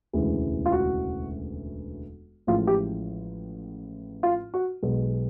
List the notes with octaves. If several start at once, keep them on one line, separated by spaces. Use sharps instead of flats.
E1 D2 C#3 E3 G#3
F4
F#4
A1 A2 F3 G#3 F4
G4
F4
F#4
B1 B2 G#3